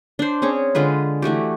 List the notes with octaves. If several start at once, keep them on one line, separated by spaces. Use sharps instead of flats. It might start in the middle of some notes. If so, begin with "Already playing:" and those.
D4 C5
C4 C#4 G#4 C#5
D3 G#3 F4 B4
E3 A3 F#4 G4